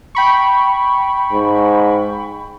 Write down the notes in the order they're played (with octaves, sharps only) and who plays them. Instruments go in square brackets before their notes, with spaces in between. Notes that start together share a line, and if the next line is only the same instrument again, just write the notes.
[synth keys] G5 B5 C#6
[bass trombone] G#2